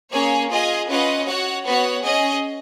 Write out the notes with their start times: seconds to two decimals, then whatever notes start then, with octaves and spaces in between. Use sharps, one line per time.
0.12 A#3 C#4 G#4 C#5 G#5
0.50 F4 G#4 D#5 G#5
0.88 C#4 F4 B4 D#5 F#5
1.26 F#4 C#5 F#5
1.64 B3 F#4 C#5 F#5
2.03 C#4 G#4 D#5